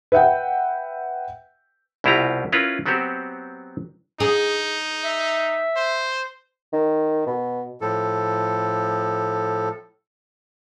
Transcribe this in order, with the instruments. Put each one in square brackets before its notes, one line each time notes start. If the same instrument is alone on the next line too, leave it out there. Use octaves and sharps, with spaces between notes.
[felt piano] B4 E5 F#5 G5
[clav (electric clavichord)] C2 B2 E4 F4 G4 A#5
C#4 E4 F4 A#4 B4
F#3 B3 C4 F#4 G4 C5
[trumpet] D#4 [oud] G#4
[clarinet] E5
[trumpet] C5
[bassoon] D#3
B2
[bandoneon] A2 F3 A4